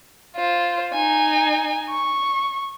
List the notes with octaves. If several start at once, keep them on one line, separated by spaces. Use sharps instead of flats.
F4 C5
D#4 G#5
C#6